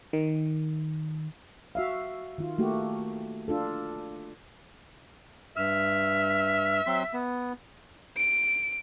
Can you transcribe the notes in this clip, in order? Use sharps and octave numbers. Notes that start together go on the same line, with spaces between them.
D#3
F#4 E5 F5
D#3 F4
A3 A#3 F#4 G4
D4 F4 A4
G2 E5 F6
F#3 C4 C6
B3
D7